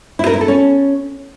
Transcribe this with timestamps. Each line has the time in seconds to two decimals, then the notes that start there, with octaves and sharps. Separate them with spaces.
0.19 E4
0.26 A#4
0.34 E4
0.41 A4
0.48 C#4